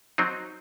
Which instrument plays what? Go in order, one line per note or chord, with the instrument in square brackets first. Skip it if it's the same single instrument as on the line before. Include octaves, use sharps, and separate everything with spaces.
[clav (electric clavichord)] F#3 C4 D#4